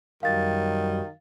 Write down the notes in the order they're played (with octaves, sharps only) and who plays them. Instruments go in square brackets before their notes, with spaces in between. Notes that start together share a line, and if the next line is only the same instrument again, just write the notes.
[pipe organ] F#2 F#3 G3 [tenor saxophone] D#3 [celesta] F5 A6